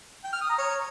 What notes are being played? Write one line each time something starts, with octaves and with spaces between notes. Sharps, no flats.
G5
F6
D#6
A#5
C#5